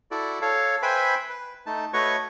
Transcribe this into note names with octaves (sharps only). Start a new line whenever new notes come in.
E4 F#4 A4 D5
A4 C#5 F5
B4 C5 E5 G5 G#5 B5
B4
A3 D#4 A5
A3 F#4 B4 C#5 D#5 C#6